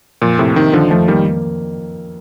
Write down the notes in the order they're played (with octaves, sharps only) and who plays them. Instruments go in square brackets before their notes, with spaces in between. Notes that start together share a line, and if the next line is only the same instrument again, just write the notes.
[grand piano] F2 [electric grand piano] A#2
[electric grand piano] A2 C3 [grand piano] A#3
[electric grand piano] C3 D#3 [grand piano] D#4
[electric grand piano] D3 F3 [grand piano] D#3
[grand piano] F2 [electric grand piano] F3 A3
[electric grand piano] D#3 G3 [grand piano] A#3